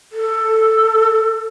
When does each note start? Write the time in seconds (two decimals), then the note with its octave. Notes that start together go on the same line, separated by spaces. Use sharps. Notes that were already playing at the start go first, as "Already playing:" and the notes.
0.12 A4